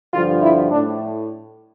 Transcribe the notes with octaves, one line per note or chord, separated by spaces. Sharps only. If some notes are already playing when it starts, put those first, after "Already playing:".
G2 D3 F3 F4
E4
A2 D4